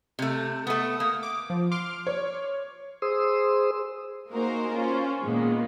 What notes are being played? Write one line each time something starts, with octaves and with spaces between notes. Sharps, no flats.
C3 A3
A3 B3 D#6
A#3
D6
F3
C6 D6 F6
C#5
G#4 C5 C6 D#6 E6
A#3 D#4 F#4 G#4 A#4 C5
C#4 F4 C5
A#2 D#3 G#3 A#3 B3